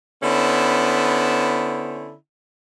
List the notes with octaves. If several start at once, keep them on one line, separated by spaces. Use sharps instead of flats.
D3 B3 C#4 E4 C5